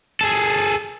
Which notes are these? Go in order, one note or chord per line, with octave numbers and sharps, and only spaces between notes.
G#4 A4